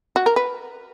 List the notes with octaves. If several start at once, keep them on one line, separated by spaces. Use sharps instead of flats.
F#4
A#4
B4